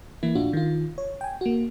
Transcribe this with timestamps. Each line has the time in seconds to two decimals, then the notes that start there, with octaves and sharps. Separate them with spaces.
0.23 E3 A#3 E4
0.35 A2 D4 F4 F#4
0.53 D#3 F4
0.98 C#5
1.21 G5 G#5
1.41 A#3 F#4